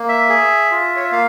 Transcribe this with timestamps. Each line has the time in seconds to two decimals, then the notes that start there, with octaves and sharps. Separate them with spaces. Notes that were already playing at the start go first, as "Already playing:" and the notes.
Already playing: A#3
0.09 E5
0.29 G#4
0.71 F4
0.96 C#5
1.04 E5
1.12 A#3 F5